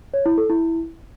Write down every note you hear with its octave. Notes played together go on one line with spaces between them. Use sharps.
C#5
E4
A4
E4